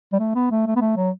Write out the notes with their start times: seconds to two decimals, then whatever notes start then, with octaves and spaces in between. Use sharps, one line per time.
0.13 G3
0.20 A3
0.35 B3
0.51 A3
0.67 A3
0.76 B3
0.81 A3
0.97 F#3